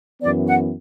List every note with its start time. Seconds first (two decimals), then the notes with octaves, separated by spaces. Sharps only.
0.22 F#2 E3 B3 D5
0.47 F#5